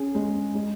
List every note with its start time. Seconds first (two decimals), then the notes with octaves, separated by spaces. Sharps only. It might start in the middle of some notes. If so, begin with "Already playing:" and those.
Already playing: C#4 G#4
0.15 G#3
0.55 G#3